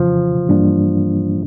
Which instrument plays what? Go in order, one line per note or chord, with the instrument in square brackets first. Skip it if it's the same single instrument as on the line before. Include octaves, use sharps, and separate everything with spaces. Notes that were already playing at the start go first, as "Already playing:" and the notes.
Already playing: [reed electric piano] F2 C#3 E3 [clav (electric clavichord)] F3
[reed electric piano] G2 E3 G3 A#3 D4